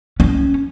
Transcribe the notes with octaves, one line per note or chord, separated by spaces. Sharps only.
C#4